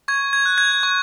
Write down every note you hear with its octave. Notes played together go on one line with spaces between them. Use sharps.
C#6 G#6
G#6
F#6
G#6
C#6